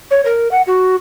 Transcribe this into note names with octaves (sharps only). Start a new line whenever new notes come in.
C#5
A#4
F#5
F#4